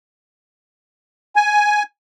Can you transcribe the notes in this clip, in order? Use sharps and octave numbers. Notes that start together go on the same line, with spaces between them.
G#5